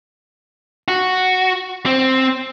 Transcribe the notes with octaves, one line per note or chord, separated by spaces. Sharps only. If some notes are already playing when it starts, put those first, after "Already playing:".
F#4
C4